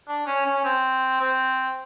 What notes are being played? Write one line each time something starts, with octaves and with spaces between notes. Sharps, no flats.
D4
C#4
C#4
C4
C4